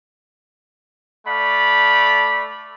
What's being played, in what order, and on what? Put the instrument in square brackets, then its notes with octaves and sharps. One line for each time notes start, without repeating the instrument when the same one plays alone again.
[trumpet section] A3 D5 F5 B5